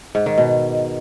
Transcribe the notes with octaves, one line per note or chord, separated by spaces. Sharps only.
G#2
D#3
B2